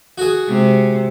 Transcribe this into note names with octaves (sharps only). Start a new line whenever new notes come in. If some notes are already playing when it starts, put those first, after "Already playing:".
F#4 G#4
C3 G#3